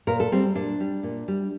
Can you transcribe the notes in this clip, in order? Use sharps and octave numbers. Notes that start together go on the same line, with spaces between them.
A#2 A#4
A4
G3 C4
A#2 D4
G3
A#2
G3